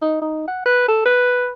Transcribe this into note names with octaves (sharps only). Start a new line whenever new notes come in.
D#4
D#4
F#5
B4
A4
B4